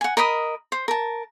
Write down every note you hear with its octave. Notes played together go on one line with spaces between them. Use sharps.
F#5 G#5
A#4 D#5 B5 D#6
C5
A#4 A5